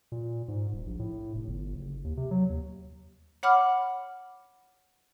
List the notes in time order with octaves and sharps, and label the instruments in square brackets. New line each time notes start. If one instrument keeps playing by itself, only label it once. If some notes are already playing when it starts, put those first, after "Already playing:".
[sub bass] A#2
G#2
D#1
A#1
A2
F1
G1
F#1
D#2
C3
F#3
D#2
[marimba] C#5 F#5 B5 D6 F6